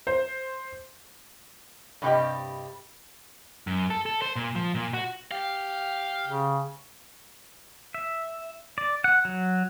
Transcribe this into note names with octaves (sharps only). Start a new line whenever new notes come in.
C5
G2 C3 G3 G4 D#5 G5
F#2
A4
A4
C5
A#2
F3
A#2
F#4
G4 F5
C#3
E5
D5
F#5
F#3